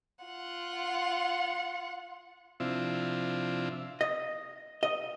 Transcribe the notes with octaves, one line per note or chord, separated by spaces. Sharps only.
F4 F#5
C3 F3 C4 D4 E4 F4
D#5
D#5